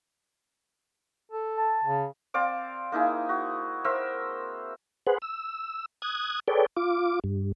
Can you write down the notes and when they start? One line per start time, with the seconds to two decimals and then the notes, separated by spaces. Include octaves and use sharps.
1.31 A4
1.57 A5
1.84 C#3
2.34 C4 D5 F5 D6
2.92 A#3 D#4 E4 G#4
3.29 F#4
3.84 A#4 C5 E5 E6
5.07 G#4 B4 C5 F#5
5.22 E6
6.02 D#6 F#6 G#6
6.48 G#4 A4 B4 C#5 D5 G5
6.77 F4 D6
7.24 G2